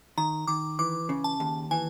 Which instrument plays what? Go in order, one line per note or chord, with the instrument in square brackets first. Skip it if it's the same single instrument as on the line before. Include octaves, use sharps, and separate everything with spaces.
[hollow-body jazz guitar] D#3 [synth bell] A#5
[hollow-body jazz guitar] D#3 [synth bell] D6
[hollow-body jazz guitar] E3 [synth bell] D6
[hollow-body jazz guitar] C#3
[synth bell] A5
[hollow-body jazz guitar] D#2
[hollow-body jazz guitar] E3 [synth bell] G#5